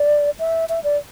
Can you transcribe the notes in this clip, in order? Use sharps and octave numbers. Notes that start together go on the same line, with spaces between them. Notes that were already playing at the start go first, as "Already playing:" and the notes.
Already playing: D5
E5
E5
D5